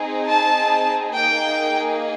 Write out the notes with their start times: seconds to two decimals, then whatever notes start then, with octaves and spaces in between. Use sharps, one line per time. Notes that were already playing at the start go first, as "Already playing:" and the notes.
Already playing: C4 D#4 G#4
0.28 A5
1.15 A#3 D#4 G#4 G5